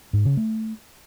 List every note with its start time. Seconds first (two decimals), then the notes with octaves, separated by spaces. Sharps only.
0.13 G#2
0.25 C#3
0.37 A3